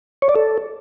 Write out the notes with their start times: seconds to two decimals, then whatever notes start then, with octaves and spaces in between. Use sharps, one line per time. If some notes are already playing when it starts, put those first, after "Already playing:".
0.22 C#5
0.29 D5
0.35 A4